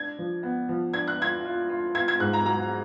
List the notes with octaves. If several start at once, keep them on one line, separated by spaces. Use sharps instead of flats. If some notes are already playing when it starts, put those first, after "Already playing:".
Already playing: D4 G#6
F3
B3
F3
D4 G#6
F#6
F4 G#6
F4
F4
F4 G#6
G#6
G#2 F#6
A#5
F#3 A#5